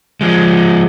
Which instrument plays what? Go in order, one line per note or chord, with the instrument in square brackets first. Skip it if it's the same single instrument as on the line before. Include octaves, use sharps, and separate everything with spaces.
[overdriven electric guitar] F3 G#3